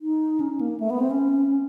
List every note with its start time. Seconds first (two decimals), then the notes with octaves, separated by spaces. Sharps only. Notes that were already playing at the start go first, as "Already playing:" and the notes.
0.01 D#4
0.40 C#4
0.61 A#3
0.80 A3
0.90 B3
1.00 C4
1.11 C#4